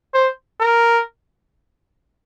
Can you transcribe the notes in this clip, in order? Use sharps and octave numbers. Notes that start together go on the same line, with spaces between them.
C5
A#4